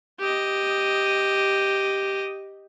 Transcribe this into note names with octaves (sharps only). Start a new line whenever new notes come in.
G4 D#5